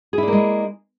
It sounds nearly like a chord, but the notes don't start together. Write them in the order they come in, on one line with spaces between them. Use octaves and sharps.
G#4 E4 D4 A#3 G#3